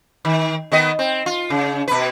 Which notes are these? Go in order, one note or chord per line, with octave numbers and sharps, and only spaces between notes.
D#3
D#3 B3 D#5
C4
F4
C#3
B2 B4